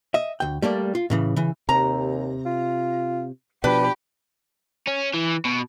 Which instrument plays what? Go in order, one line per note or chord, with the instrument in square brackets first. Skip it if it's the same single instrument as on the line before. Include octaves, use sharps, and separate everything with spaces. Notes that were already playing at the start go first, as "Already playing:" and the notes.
[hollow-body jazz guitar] D#5 E5
D2 G5
G3 A3 A#3 D5
F4
A2 C#3 E3
C#3 E3
[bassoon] D#2 [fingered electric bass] C3 [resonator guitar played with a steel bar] A#5
[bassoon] F4
[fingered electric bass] B2 F3 [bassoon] D4 [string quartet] G4 B5 [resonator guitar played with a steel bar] B4
[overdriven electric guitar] C#4
E3
B2